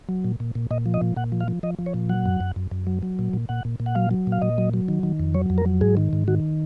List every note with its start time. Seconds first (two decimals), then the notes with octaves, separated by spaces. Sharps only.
0.09 F#3
0.24 A#2
0.40 A#2
0.55 A#2
0.71 A#2 D#5
0.86 F3
0.94 D#5
1.02 A#2
1.16 A#2 F#5
1.32 F3
1.41 F5
1.48 F3
1.63 F3 D#5
1.79 F3
1.86 C#5
1.94 A#2
2.09 F#3 F#5
2.26 F#2
2.41 F#2
2.56 F#2
2.71 F#2
2.87 F#3
3.03 F#3
3.19 A#2
3.33 A#2
3.49 A#2 F#5
3.65 A#2
3.80 A#2
3.86 F#5
3.95 F#3 F5
4.11 F#3
4.27 A#2
4.32 F5
4.42 A#2 D#5
4.58 F#3
4.74 F#3
4.88 D#3
5.03 D#3
5.20 F2
5.34 F#3 C#5
5.50 F2
5.58 A#4
5.66 F#3
5.81 G#2 G#4
5.97 D#3
6.13 G#2
6.28 D#3 F#4